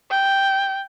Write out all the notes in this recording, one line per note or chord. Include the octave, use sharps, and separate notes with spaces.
G5